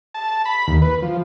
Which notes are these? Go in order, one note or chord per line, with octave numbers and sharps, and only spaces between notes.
A5
B5
D#2
B4
F3